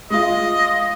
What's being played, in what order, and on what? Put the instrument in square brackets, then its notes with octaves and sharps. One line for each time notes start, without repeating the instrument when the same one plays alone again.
[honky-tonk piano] G#3 F4 [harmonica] D#5